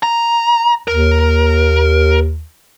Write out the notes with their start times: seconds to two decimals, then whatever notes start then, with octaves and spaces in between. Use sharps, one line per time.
0.03 A#5
0.88 D#2 A#4